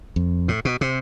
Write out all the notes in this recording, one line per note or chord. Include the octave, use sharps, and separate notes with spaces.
F2
A2
B2
C3